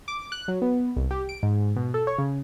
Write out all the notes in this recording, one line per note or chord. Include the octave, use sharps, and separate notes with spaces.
D6
F#6
F#3
B3
C2
G4
D7
G#2
B2
A4
C#5
C#3